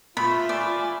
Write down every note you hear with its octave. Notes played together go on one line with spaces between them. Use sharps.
A#2 A3 B3 F4 E5 B5
A3 D5 G#5 B5